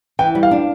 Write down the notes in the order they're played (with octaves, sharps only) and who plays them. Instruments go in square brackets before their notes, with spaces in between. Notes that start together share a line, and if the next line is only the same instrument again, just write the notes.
[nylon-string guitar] E3 [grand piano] G5
[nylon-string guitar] G3
[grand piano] F5
[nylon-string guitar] D4